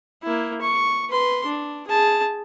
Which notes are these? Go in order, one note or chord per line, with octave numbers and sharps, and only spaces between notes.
A#3 E4
C#6
B4 C6
D4
G#4 A5